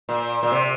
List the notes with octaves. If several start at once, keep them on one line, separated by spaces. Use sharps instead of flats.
A#2
A#2
C3